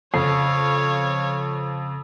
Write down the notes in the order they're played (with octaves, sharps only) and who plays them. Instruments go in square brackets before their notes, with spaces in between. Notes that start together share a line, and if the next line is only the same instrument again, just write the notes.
[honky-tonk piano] F2 [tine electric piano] C#3 C7 [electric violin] C#5 F5